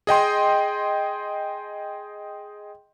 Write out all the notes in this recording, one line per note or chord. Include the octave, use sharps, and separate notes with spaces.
G#4 D#5 G5 C6